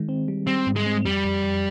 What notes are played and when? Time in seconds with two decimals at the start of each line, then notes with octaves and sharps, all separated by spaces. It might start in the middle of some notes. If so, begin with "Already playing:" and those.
Already playing: D#3 G#3
0.09 C4
0.28 G3
0.47 G3 C4
0.67 G#2
0.76 G#3
0.86 C4
1.05 F2 G3
1.24 F2
1.44 F2